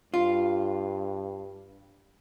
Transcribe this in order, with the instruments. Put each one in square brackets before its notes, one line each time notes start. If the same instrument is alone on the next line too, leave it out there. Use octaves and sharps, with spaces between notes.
[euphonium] G2 [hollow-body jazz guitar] F4